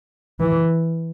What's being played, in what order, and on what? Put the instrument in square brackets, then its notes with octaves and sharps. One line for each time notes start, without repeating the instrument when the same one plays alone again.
[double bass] E3